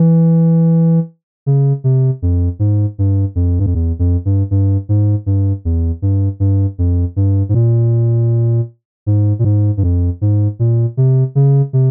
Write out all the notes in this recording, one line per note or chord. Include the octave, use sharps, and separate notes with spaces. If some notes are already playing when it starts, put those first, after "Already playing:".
Already playing: E3
C#3
C3
F2
G#2
G2
F2
G2
F2
E2
F2
G2
G2
G#2
G2
E2
G2
G2
F2
G2
G#2
A#2
G#2
A#2
G#2
G2
F2
G#2
A#2
C3
C#3
C3